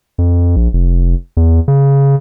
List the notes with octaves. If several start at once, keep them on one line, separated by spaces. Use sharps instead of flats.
F2
A#1
F1
E2
C#3